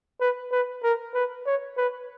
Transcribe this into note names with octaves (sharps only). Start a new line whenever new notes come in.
B4
B4
A#4
B4
C#5
B4